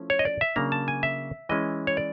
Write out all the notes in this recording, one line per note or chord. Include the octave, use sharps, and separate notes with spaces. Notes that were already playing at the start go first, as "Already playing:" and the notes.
Already playing: F3 A3 C#4 E4
C#5
D#5
D5
E5
C#3 F#3 A#3 D4 A#5
A5
G#5
E5
E3 G#3 C#4 E4 D#5
C#5
D5